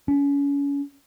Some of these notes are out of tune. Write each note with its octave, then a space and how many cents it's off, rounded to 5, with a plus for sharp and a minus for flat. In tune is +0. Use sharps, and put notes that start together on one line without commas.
C#4 +30